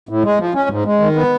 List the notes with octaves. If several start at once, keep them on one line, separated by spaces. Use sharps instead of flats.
A2
G#3
F3
C#4
G#2
G#3
D#3
B3